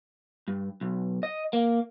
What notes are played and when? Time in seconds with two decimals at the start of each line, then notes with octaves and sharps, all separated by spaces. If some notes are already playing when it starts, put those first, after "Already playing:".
0.48 G2
0.81 B1
1.23 D#5
1.53 A#3